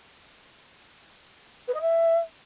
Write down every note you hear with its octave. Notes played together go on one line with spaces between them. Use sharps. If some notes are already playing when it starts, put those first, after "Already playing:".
B4
D#5
E5